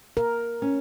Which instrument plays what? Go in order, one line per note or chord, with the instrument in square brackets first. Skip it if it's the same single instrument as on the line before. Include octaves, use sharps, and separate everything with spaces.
[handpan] A#4
[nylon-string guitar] C#4